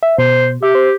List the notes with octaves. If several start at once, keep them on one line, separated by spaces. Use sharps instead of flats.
E5
B2 C5
G4 E5
C5